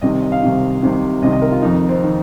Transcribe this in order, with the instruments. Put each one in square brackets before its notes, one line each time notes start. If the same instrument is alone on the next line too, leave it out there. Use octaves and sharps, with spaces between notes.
[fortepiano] C2 C3 D#3 D#5
D#5
F5
C2 C3 D#3
C2 C3 D#3
C2 C3 D#3 D#5
D#5
A#4
F4
F2 D#3 D#4
C4
D#3